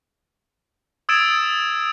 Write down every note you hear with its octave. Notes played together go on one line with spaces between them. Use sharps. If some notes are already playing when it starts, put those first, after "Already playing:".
D#6 E6 G#6 A6 D7 E7